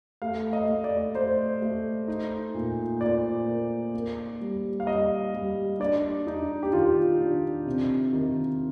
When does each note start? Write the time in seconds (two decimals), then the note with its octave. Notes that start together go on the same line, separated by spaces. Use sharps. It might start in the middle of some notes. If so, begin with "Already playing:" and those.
0.22 A3 F5
0.53 D#5
0.68 A3
0.84 D5
1.15 A3 C5
1.62 A3
2.08 D#4
2.54 A#2
3.01 A#2 D5
3.48 A#3
3.94 A#3
4.41 G3
4.80 F5
4.87 G3 D#5
5.34 G3
5.80 D4 D5
6.27 D4 D#4
6.63 G4
6.73 D#3 F4
7.19 D4
7.66 C3
8.13 D#3